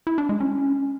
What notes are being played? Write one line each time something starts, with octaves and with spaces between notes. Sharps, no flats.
E4
D4
G#3
C#4